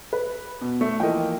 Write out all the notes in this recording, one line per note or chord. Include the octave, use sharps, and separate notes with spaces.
B4
B2
A3
E3 F3 A#3 D#5 G5